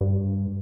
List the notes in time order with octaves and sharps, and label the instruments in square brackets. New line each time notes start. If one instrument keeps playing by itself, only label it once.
[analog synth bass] G2